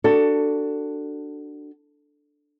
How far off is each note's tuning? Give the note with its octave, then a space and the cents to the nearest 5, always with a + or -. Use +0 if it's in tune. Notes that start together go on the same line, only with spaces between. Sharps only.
D4 +10 F#4 +20 A4 +15